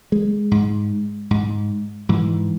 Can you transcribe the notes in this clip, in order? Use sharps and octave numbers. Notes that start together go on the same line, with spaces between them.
G#3
G#2
G#2
G#2 E3